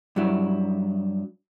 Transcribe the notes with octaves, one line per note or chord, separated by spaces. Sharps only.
G2 F#3 E4